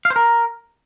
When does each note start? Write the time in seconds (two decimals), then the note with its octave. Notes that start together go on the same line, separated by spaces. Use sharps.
0.05 F5
0.10 C5
0.16 A#4